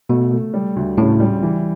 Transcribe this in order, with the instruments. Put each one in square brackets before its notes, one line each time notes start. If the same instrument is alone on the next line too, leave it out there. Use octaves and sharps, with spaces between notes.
[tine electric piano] B2 [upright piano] A3
[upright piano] A3
G3
D2
[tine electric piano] A2 [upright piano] C#3
[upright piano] G3
E3